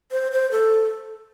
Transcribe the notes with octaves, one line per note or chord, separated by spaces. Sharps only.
C5
C5
A4